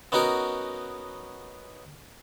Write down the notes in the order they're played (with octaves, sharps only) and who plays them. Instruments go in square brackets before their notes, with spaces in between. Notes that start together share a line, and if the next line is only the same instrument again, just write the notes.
[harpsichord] B3 C#4 D#4 F#4 A#4